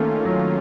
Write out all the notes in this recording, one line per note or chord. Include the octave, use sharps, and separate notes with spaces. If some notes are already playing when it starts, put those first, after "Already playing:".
Already playing: D#3 A3 A#3 C#4 F4
F#3